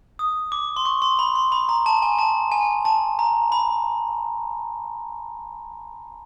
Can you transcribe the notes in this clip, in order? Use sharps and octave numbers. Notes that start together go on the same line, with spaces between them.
D#6
D6
C6
C#6
C6
B5
C6
B5
A#5
A5
G#5
A5
G#5
A5
A#5
B5